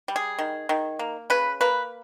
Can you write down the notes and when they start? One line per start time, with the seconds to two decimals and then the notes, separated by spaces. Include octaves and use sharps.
0.08 G3
0.16 G#4
0.39 D#3
0.69 D#3
0.99 A#3
1.30 C#3 B4
1.61 A#3 B4